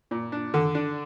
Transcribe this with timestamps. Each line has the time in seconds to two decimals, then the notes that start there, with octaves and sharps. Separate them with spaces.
0.11 A#2
0.32 D4
0.54 D3
0.75 D4